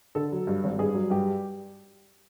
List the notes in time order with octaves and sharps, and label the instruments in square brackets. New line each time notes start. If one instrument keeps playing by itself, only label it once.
[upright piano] D3 A4
F#3
G2
G#1
G2 G#4
F#3
G2 G4